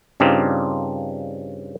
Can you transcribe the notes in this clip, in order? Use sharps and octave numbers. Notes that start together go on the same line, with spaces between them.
G2 C#3 C4 D4 D#4 F4